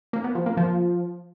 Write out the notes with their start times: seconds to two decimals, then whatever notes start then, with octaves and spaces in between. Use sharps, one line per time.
0.13 A#3
0.24 B3
0.35 F3
0.46 A#3
0.57 F3